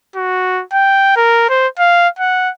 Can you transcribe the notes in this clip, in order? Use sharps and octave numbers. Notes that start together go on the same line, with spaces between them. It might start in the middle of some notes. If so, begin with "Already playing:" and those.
F#4
G5
A#4
C5
F5
F#5